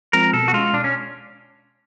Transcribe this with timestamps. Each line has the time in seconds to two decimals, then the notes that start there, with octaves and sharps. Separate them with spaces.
0.13 F3 G#3 C4 F4 A#4
0.33 B2 A4
0.48 F#4
0.53 G#3 C#4 F4
0.73 B2 D4
0.84 C#4